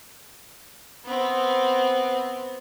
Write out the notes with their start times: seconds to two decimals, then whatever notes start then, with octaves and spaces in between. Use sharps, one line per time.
1.05 B3 C4